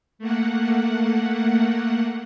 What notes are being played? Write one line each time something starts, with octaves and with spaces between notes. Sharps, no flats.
A3 A#3 F#5